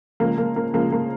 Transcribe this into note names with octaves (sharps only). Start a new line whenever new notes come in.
C#3 F3 G#3 A#3
A#3
A#3
C#3 F3 G#3 A#3
A#3